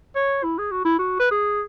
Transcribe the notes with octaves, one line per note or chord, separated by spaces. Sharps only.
C#5
E4
G#4
F#4
E4
F#4
B4
G#4